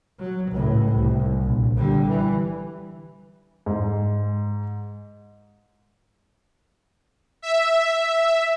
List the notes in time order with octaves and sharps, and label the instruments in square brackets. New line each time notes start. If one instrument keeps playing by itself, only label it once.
[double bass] F#3
C#2 A2
C2
A#1
D3 G3
E3
[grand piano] G#2
[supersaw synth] E5